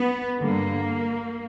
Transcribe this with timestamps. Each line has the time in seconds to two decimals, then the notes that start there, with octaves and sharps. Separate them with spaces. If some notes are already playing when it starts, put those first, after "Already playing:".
Already playing: B3
0.40 G2 D3 G3 A#3